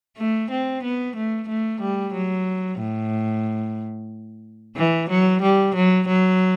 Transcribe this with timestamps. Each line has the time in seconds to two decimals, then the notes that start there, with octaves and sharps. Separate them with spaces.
0.17 A3
0.51 C4
0.83 B3
1.16 A3
1.48 A3
1.81 G3
2.14 F#3
2.80 A2
4.77 E3
5.09 F#3
5.42 G3
5.75 F#3
6.08 F#3